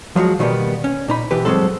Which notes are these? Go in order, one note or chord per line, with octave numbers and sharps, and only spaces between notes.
F3 F#3 G#3 F#4
B2 D#3 F#3 G3 A#3 B3
C#4
A#2 D#4 B5
B2 E3 G4 B4
G2 F#3 G#3 C4 A4